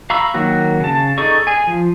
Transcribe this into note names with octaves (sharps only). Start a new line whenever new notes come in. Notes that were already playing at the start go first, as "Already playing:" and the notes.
F5 A#5 B5 C#6 E6
D#3 F#3 A#3 F#4
C#3 A5
D#4 G#4 A4 D5 C#6
G#4 G#5
F3